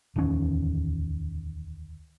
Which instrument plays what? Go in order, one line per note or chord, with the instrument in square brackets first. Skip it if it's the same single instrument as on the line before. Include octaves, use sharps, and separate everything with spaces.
[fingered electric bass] D1 E2 D#3 C#4